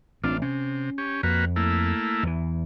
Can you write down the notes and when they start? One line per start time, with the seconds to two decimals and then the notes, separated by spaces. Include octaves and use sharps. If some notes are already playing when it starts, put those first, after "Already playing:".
0.24 A1 C4 D4 F4
0.42 C3 C#4
0.98 C#4 G4
1.23 F2 A#3 F#4 B4
1.56 A3 A#3 E4
2.23 E2 E3